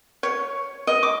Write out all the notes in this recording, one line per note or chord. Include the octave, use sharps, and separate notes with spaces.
C#5
D#5
D6